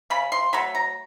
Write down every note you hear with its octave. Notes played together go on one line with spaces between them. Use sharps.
C#3 B5
C6
F#3 A3 B5
A#5